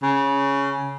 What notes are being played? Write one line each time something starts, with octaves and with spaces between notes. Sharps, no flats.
C#3